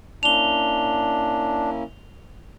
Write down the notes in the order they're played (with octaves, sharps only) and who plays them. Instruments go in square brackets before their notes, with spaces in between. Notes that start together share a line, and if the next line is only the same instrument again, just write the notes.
[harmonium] A#3 C#4 E4 [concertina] D4 [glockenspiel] F7 G7